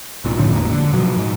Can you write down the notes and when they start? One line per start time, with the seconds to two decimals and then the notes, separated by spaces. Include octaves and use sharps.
0.25 C2 A#2
0.36 F#1 A2 D3 F3
0.53 A1 E2 G#2 A#3
0.71 D3
0.93 B2 F3 F#3
1.17 G#2